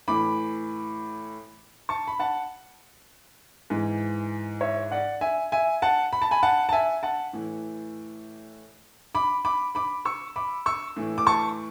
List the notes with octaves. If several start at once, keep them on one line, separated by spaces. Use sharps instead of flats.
A2 E3 B5 D6
A5 C#6
B5
F#5 A5
G#2 E3
C#5 E5
D5 F#5
E5 G#5
E5 G#5
F#5 A5
B5
A5
G#5 B5
F#5 A5
A5
E5 G#5
F#5 A5
A2 E3
B5 D6
B5 D6
B5 D6
C#6 E6
B5 D6
C#6 E6
A2 E3
D6
A5 C#6